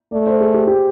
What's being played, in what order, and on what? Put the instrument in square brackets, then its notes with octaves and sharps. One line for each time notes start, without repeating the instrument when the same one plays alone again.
[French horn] A3 [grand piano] D5
[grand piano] C5
G#4
G4
G4